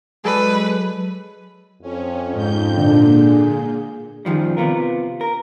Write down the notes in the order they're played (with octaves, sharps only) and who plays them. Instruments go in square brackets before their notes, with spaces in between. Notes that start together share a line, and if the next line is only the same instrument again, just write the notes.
[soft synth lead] F#3 [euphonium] G#3 [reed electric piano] G#4 A4 D5 [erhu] B4
[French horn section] F2 [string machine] C#4
[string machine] G#2 G6
[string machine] A#2 [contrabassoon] D3
[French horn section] G#4
[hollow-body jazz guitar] F#2 B2 D#3 F3 G3
C3 B3 F4 A#4
A#4